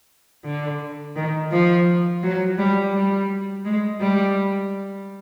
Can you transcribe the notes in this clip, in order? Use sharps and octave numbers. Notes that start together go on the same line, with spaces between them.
D3
D#3
F3
F#3
G3
G3
G#3
G3